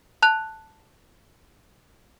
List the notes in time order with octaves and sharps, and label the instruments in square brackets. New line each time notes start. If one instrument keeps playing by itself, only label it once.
[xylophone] A5 F#6 F7